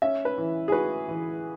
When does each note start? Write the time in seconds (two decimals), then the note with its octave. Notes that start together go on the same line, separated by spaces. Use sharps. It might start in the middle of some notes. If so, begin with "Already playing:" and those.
0.02 C#4 E5
0.25 B4
0.38 E3
0.68 G#4
0.72 F#4 B4
1.08 E3